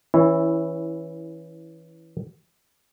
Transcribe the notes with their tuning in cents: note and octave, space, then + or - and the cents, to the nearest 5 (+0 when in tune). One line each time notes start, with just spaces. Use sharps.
E3 -15 C#4 +0 E4 +0